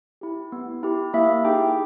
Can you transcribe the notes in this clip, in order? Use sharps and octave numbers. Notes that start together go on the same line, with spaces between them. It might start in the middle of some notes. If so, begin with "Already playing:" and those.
E4 G4
B3
E4 G4
A#3 E4 E5
D#4 G4 G#4 G5